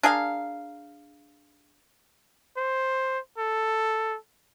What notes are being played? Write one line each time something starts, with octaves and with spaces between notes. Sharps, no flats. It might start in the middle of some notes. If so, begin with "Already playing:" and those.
D4 G#4 A#4 F5
C5
A4